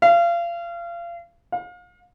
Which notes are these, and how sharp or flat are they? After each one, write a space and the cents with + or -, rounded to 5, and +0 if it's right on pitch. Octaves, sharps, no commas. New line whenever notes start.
F5 -30
F5 +35